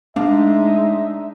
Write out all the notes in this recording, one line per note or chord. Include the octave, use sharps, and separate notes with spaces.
G#3 A3 D4 D#4 E5